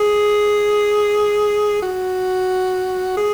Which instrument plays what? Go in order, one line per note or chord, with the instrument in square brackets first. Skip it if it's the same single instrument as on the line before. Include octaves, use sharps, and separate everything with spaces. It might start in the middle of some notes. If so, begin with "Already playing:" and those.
Already playing: [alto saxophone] G#4
F#4
G#4